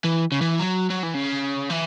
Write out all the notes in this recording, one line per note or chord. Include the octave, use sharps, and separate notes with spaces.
E3
C#3
E3
F#3
F#3
E3
C#3
E3